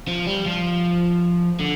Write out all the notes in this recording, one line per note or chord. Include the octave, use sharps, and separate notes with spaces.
F3
G3
F3
D3